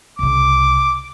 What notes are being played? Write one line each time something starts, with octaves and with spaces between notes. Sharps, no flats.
C2 C#3 D6